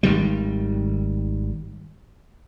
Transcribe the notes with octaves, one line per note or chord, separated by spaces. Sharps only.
G#1 D#3 G3